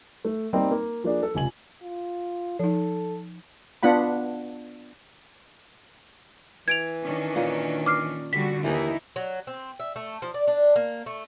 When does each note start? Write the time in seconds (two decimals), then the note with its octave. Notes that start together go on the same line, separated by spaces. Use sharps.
0.25 A3
0.53 G3 A#3 C4 D#4
0.71 A#3
1.04 F3 A#3 D4 G#4
1.23 A4
1.35 F1 C#2 G#5 F#7
1.82 F4
2.59 F3 D#4 A4
3.83 B3 D4 F4 F#5 B5
6.68 E3 G#6 D7 F7
7.03 D#3 C#4 D4
7.36 A#2 D#5
7.86 D6 F6 C7
8.33 D3 G3 F#4 B6
8.64 D#2 E3 D#4 E4
9.16 F#3
9.47 C4
9.80 E5
9.96 A3
10.22 F3
10.34 D5
10.47 D4
10.76 A#3
11.06 A3